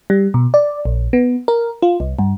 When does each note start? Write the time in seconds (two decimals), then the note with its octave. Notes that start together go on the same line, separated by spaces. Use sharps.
0.10 G3
0.34 B2
0.54 D5
0.85 A#1
1.13 B3
1.48 A#4
1.82 F4
2.00 C2
2.19 G2